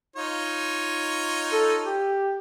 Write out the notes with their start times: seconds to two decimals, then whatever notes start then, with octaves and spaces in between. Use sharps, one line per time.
0.16 D#4 F4 C#5
1.52 A4
1.86 G4